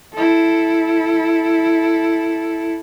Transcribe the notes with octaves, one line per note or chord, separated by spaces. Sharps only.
E4 A4